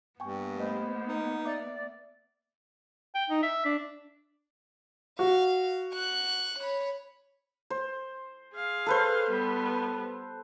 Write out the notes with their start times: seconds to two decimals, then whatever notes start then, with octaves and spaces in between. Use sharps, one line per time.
0.20 G2 A#3 B3 G5 G#5 C#6
0.58 A3 C5 D#5 B5
1.07 D#4
1.45 D5 E5 D6
3.15 G5
3.30 D#4
3.42 E5
3.65 D4
5.19 F#4 F5
5.94 C#6 F#6
6.59 C#5 B5
7.70 C5
8.54 G#4 F5
8.86 A4 B4 C5
9.29 G3 B3